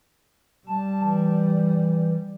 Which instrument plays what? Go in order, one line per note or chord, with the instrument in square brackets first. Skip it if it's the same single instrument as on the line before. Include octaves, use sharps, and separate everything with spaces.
[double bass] G3 [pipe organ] A5
[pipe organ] E3